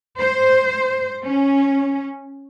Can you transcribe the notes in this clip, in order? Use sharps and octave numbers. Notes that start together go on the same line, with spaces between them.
C5
C#4